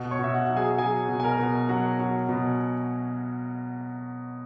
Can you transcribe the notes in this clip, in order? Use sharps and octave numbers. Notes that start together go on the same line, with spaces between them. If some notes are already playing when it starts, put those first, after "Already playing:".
Already playing: B2
C#5 C#6
B2 E5
F#4 F#5
F#3
G#4 G#5
F#3 G#4 G#5
B2
G#5
A#4 A#5
B2
F#3 F#4 F#5
F#3
B2